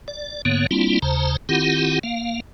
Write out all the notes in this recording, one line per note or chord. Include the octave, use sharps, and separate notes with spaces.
D5
G#2 D3 A#3 B3 C#5
G3 A#3 C4 D4 E4 F4
D#2 C#3 C5 A5 A#5
D#3 C4 E4 F4 G4 F#5
A#3 F5